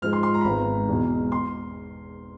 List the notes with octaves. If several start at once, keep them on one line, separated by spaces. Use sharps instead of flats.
G#2 F3 G#3 F6
C6
C6
A#5
B5
G#1 G#2 D#3 G#3 B3 A#5
E2 B2 G#3
C6